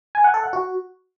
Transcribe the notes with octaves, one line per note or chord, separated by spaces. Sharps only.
G#5
F#5
A4
F#5
F#4